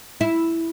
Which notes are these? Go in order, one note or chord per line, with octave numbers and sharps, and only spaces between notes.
E4